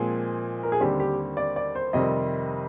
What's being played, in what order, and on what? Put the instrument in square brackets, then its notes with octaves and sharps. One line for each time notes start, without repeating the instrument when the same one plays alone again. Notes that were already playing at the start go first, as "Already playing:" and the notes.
Already playing: [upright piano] A#2 F3 G#3 C4 G#4
A#4
G#4
D#2 D3 G3 C4 G4
G4
D5
D5
C5
F2 C3 D#3 G3 C4 D#5